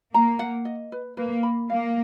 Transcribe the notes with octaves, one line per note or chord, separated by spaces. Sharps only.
A#3 A#5
F#5
D#5
B4
A#3 B4
B5
A#3 F5